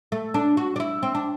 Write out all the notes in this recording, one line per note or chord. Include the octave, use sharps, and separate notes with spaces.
A3
D4
F#4
D4
E4
C4
D4